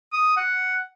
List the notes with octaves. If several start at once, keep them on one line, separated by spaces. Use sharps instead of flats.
D#6
F#5